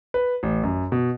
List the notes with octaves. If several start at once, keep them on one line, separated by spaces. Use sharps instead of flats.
B4
A1
F#2
B2